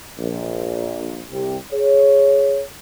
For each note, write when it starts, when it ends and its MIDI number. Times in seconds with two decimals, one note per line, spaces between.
0.18 1.22 34
0.18 1.22 46
1.30 1.57 36
1.30 1.57 48
1.30 1.57 67
1.72 2.62 68
1.72 2.62 73